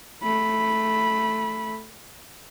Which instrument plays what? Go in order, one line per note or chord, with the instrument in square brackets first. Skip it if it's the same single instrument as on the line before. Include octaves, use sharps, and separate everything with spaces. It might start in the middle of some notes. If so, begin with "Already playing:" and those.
[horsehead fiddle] A3 B5